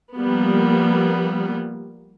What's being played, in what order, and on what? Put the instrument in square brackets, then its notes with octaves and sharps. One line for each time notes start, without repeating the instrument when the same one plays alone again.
[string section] F3 G3 A#3 B3